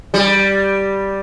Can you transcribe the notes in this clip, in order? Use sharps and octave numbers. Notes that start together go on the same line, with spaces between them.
G3